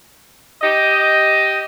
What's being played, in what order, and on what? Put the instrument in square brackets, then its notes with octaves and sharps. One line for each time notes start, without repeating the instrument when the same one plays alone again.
[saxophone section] G4 D#5